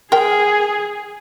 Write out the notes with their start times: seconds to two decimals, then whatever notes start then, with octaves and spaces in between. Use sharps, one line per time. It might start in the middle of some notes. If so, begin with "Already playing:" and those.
0.12 G#4 A#4 G5